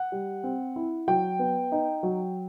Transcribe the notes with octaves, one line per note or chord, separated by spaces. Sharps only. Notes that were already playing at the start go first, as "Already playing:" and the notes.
Already playing: F#5
G3
C4
E4
F#3 G5
B3
D#4
F#3